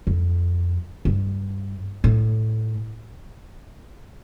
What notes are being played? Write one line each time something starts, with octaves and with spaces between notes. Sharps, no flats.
F2
G2
A2